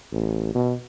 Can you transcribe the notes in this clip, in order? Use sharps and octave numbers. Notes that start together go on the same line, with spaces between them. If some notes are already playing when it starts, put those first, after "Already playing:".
A1
B2